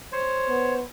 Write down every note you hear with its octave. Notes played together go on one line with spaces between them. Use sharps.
C5 C#5
B3